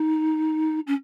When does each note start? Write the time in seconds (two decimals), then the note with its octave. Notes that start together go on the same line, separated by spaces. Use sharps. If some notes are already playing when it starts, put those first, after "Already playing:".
Already playing: D#4
0.87 C#4